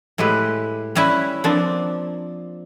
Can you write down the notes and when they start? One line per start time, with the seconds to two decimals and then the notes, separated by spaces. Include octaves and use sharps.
0.18 A2 G#3 E4 G4 B4
0.95 G3 C#4 E4 B4 E5
1.44 F3 A#3 C4 D4